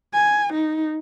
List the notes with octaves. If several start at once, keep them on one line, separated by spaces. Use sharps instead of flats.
G#5
D#4